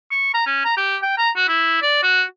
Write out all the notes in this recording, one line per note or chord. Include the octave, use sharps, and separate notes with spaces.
C#6
A#5
C#4
A#5
G4
G5
A#5
F#4
E4
D5
F#4